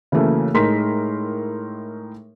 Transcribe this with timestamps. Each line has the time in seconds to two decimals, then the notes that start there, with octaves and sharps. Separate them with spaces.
0.12 C#3 E3 F#3 A3 A#3
0.54 A2 G#3 D#4 A#4 C6 B6